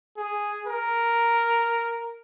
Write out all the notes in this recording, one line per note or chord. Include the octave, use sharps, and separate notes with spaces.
G#4
A#4